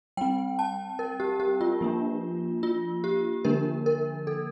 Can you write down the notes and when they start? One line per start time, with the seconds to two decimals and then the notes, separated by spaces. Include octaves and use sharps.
0.17 G3 C4 G5
0.59 A5
0.99 A#4
1.20 G4
1.40 G4
1.61 F4
1.81 F3 A#3 D4
2.63 F4
3.04 G4
3.45 D3 F3 A#3 D4 A#4
3.86 A#4
4.27 A4